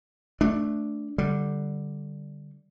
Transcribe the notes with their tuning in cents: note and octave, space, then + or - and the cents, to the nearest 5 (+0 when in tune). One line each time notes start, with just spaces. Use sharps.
A3 +0 D4 +0
D3 +0 G3 -5